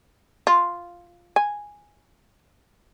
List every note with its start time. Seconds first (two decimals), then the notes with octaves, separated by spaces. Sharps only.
0.47 F4
1.36 G#5